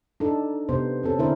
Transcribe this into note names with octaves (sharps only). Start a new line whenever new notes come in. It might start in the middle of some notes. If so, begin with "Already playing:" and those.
D4 D#4 A4
C3 B3 C5
C4 C#4 A4
D3 C4 D4 E4 A#4 C5